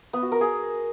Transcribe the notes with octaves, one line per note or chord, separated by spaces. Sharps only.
B3
F#4
A#4
G#4